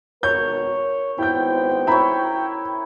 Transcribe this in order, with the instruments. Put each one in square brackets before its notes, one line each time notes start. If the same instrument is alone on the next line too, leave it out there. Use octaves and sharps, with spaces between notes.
[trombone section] G#1 B2 A#4 [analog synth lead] C#5 [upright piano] G6
[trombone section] G#1 B3 C5 [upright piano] E4 G6 [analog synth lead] G5
[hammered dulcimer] E4 A#4 C#5 [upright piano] E5 A#5 B5